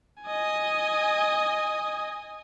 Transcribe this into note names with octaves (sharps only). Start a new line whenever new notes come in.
D#5 G#5